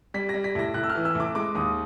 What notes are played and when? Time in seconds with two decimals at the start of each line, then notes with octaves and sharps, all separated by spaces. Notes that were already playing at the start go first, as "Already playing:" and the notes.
0.14 G3 B6
0.29 G3 A#6
0.44 B6
0.55 A2 A#6
0.74 A2 F#6
0.83 E6
0.90 F6
0.95 E3
1.05 E6
1.15 A2 D6
1.35 G#3 D6
1.55 D#2 D#6